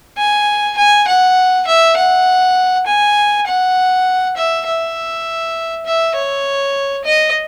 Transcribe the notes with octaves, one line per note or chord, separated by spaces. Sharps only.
G#5
G#5
F#5
E5
F#5
G#5
F#5
E5
E5
E5
C#5
D#5